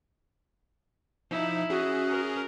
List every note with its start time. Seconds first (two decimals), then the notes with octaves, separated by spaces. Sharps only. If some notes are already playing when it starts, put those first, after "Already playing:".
1.31 F3 D#4 E4
1.70 C#4 F#4 G#4
2.10 A#4